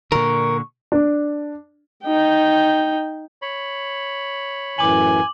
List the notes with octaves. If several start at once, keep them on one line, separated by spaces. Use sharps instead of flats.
A#2 D3 A#4 C#6
D4
D#4 G5
C#5 B5
F#2 A2 E3 G#5 D6 F#7